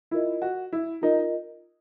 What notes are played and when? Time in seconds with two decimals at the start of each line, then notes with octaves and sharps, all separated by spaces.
0.11 E4 F4 A#4 D#5
0.42 F#4
0.73 E4
1.02 D#4 F4 A#4 D#5